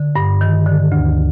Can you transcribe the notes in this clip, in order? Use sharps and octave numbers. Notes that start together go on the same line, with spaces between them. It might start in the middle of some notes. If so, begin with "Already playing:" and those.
Already playing: D3
G2
D#3
D3
D2